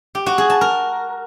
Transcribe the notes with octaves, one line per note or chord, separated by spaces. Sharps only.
G4
F#4
G#4
A5
A#4